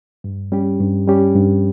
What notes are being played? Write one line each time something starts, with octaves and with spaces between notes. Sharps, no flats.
G2
G3 C#4 G4
G2
G3 C#4 G4
G2